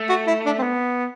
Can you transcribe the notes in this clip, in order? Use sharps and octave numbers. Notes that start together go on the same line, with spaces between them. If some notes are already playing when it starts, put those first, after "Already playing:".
Already playing: A3
F#4
E4
D4
C4
B3